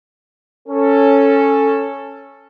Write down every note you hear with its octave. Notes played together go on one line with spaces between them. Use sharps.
C#4 A4